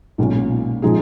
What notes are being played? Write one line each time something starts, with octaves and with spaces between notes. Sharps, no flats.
B1 A#2 G#3 C#4
A#2 F3 G#3 D#4 G#4